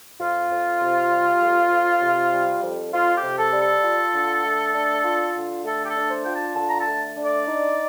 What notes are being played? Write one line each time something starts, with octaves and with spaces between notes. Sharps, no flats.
F2 F4
F2
C3
G3
F2
F2
C3
G3
F2
F2 F4
G4
C3
A4
G3
A4
F4
D3
A3
D4
F4
D3
A3 A4
G4
A4
D4
C5
F4 G5
A5
D3 A5
A#5
A5
A3
D4
D5
D#4